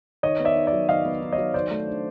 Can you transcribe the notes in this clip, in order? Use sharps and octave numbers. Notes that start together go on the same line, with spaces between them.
D#3 C#5 D#5
B3
D5 E5
D#4
D5 E5
F#3
D#3 D#5 F5
B3
D#4
C#5 D#5
F#3
D#3 C5 D5
A3
D4